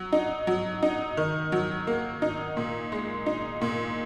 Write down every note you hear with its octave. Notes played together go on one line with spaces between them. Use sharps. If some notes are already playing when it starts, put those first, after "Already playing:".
Already playing: F#3
D#4
F#3
D#4
D#3
F#3
A#3
D#4
A#2
G#3
D#4
A#2